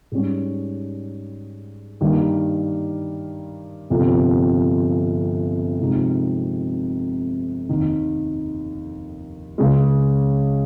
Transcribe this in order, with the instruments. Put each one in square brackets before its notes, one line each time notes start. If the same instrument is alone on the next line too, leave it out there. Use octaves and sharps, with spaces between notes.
[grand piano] G#2 G3 C#4
G2 D#3 G3 A#3
G1 F2 C3 F3
F2 C3 F3 G#3 D#4
F1 D#2 D#3
C#2 C#3 G#3